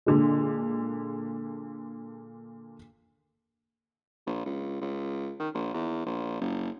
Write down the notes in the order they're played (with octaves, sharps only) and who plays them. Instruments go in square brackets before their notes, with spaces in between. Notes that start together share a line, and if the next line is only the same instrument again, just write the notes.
[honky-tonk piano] A#2 D3 G#3
[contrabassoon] A#1
C#2
C#2
D#3
A#1
E2
A#1
F#1